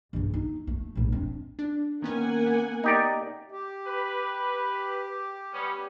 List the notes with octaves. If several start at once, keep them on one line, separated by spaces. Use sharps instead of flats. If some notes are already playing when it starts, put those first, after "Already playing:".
G2 C#3
D#4
A3
A#1 A2
C4 D4
D4
D#3 A#3 B3 C#4 F#5 G#5
B3
D#4 G4 D5
G4
B4
G3 B3 C#4